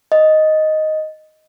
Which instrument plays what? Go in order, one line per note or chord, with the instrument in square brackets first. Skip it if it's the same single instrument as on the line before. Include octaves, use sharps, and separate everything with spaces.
[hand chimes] D#5